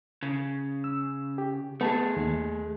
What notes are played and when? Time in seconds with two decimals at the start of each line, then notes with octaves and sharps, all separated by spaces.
0.23 C#3
0.84 E6
1.38 G4
1.81 A3 B3 G#4 A5 A6
2.17 D#2